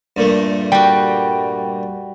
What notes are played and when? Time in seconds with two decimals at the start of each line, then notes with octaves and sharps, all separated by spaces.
0.17 G2 A#2 A3
0.72 G3 F#4 G5